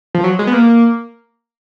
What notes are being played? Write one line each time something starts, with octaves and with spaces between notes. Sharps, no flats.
F3
F#3
G#3
B3
A#3